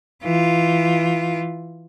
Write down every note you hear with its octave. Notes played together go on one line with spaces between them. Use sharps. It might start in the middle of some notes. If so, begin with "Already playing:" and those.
E3 F4